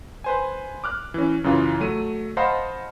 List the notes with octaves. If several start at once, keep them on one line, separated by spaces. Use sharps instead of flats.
B4 C5 G#5
D6 F6 F#6
E3 C#4
F#2 C#3 E3 F4
F#3 A3 D#7
C5 D#5 F5 F#5 A5 B5